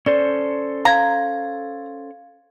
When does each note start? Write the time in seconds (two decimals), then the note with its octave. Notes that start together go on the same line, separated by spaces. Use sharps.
0.06 C#4 A4 C5 D5
0.85 F5 A#5 G#6